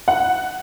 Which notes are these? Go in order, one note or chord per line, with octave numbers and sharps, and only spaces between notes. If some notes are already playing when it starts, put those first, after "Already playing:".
F#5